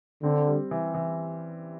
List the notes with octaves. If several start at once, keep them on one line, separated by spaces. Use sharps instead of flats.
D3 C4
G3
E3
E3